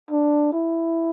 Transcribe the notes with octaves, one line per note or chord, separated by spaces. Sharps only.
D4
E4